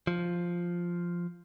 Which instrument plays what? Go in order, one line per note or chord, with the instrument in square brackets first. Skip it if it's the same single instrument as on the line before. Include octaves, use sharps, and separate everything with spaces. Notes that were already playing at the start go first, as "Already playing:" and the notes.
[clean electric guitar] F3